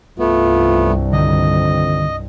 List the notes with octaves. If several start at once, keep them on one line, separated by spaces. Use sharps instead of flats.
C2 G2 A3 B3 F4
F2 D3 D#3 D#5